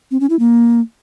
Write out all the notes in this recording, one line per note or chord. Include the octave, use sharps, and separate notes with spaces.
C4
C#4
E4
A#3